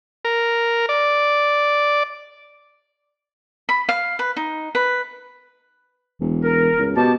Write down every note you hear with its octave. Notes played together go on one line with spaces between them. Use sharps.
A#4
D5
B5
F5
B4
D#4
B4
E1
A#4
C#2
B2 G4 A5